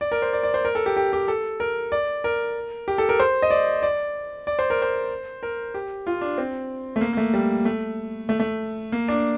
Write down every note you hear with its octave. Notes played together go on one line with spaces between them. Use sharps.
D5
A#4
C5
D5
D5
C5
A#4
A4
G4
G4
G4
A4
A#4
D5
A#4
G4
A4
A#4
C5
D#5
D5
D5
D5
C5
A#4
C5
A#4
G4
F4
D4
C4
A3
A#3
A#3
A3
G3
A3
A3
A3
A#3
D4